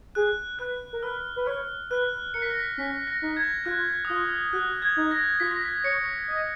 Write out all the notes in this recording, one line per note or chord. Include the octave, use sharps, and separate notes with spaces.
G#4 F#6
B4 F#6
A#4
B4 F6
B4
C#5 F6
B4 F#6
A#4 C#7
B6
A#6
B6
C#4 B6
A#6
D#4
G#6
F4 F#6
D#6
F4 F6
F#4 F#6
G#6
D#4
A#6
F4 B6
A#6
B6
C#5 C#7
D#5